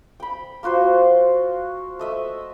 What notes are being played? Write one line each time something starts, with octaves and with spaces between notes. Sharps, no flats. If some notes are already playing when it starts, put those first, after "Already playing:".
G5 B5
A#3 F4 F#4 C5
A3 D#5 E5